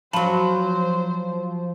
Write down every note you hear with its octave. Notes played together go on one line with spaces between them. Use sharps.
F3 F#3 F4 C5 A5 B5